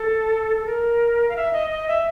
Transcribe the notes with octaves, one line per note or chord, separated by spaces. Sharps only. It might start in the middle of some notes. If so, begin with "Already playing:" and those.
Already playing: A4
A4
A#4
F5
E5
D#5
D#5
E5